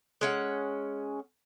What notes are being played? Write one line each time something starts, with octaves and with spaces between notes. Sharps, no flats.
G#3 C#4 F#5